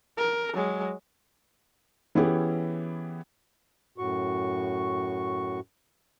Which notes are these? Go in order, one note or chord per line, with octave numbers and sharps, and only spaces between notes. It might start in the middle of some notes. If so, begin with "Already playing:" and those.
A#4
F#3 G#3
E3 B3 C#4 E4 G4 G#4
F#2 A2 F#4 C#6